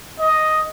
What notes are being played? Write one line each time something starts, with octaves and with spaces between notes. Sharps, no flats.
D#5